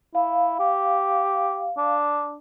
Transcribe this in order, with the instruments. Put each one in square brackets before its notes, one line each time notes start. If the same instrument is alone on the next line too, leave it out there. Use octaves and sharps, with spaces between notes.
[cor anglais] E4 [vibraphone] F5
[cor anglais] G4
D4